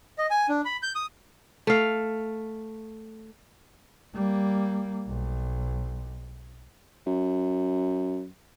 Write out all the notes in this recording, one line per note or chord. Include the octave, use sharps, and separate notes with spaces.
D#5
G#5
D4
B5
G6
D#6
A3 F5
G3 A#3
B1
F#2